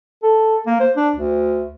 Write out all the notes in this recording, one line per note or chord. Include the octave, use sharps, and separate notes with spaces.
A4
A#3
C5
D4
D2